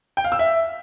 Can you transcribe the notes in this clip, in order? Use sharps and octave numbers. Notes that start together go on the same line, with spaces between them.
G5
F5
E6
E5